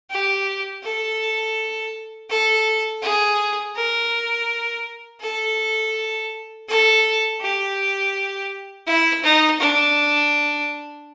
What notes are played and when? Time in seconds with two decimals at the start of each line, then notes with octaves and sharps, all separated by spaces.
0.10 G4
0.84 A4
2.29 A4
3.02 G#4
3.75 A#4
5.21 A4
6.68 A4
7.41 G4
8.87 E4
9.23 D#4
9.60 D4